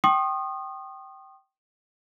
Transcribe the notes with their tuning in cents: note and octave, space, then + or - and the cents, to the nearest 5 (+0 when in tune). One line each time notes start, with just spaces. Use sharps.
G5 -20 C6 +45 D#6 -20